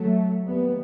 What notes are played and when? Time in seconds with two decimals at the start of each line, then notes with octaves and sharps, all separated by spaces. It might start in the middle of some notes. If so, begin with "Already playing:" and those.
Already playing: F#3 A3
0.44 D#2 G3 B3